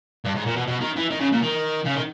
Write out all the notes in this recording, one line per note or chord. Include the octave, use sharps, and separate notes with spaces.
G2
G#2
A#2
B2
B2
D#3
E3
D#3
C#3
A#2
D#3
C#3
D#3